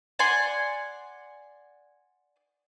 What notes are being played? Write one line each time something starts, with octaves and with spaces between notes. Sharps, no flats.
D5 F#5 G#5 C6